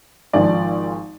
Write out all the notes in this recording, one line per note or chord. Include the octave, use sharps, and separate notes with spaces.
G#1 G#2 F3 G#3 D5